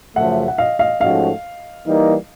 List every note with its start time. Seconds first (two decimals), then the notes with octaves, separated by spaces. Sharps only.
0.16 F#2 C#3 F3 A3 E5 F#5
0.48 F#5
0.58 D#5 F5
0.79 D#5 F5
1.00 G#2 F3 A3 C#4 F#4 D#5 F5
1.85 E3 G3 A#3 D#4